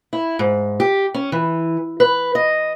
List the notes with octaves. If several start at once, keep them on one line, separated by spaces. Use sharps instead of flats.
E4
G#2
G4
C#4
E3
B4
D#5